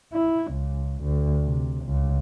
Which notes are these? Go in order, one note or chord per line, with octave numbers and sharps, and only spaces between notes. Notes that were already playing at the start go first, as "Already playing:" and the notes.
E4
C#2
D2
C3
C#2